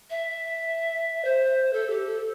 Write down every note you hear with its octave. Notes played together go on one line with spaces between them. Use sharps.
E5
C5
A4
G4
A4